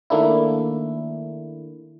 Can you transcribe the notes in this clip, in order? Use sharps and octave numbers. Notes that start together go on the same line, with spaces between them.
D#3 A3 A#3 D4 E4